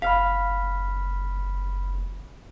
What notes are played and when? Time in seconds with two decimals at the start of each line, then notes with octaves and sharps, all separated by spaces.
0.02 F#1 F5 B5 F6 B6